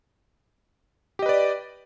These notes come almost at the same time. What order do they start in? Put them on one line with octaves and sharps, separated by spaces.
G4 D#5 B4 D5